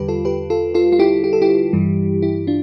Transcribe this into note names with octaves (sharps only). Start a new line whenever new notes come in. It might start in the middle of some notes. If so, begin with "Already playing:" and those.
Already playing: E2 D3 G3 G4 B4
F4 A4
G4 B4
F4 A4
F4 A4
F4
E4 G4
G4
A4
E4 G4
G2 E3 G3
E4 G4
D4 F4